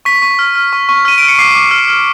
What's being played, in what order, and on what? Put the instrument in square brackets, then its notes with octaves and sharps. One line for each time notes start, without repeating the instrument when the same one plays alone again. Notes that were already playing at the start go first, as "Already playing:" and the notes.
[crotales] C#6 B6
C#6
F6
F6
C#6
C#6
F6 D#7
F6 D7
C#7
D6 C7
D6
F6
F6